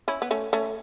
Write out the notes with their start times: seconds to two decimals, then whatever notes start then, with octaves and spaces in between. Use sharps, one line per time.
0.08 C#4 E4
0.22 B3
0.31 A3 C#4
0.53 A3 C#4